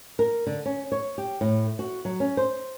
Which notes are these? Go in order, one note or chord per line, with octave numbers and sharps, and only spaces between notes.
A#4
D3
C#4
C#5
G4
A2
F#4
F#3
C#4
C5